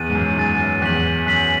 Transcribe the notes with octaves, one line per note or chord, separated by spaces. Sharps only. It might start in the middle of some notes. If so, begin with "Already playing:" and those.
Already playing: E2 F#6 A6 D#7
G#2
F#2
F#2 F#6 A6 D#7
F#2
E2 F#6 B6 F#7
F#2 F#6 B6 F#7